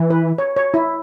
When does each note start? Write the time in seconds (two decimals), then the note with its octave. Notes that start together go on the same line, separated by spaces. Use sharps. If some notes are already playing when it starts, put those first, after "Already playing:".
Already playing: E3
0.10 B4
0.38 C#5
0.57 C#5
0.74 E4